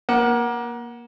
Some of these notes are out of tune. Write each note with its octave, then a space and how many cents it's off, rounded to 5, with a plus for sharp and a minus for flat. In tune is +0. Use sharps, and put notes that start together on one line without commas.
A#3 +25 F#5 +0